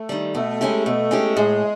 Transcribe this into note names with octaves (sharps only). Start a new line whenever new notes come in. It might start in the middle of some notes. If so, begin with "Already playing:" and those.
Already playing: A3
D#3 G3
B2 A3
G#3 C#4 E4 G4
B2 A3
G#3 C#4 E4 G4
A2 G#3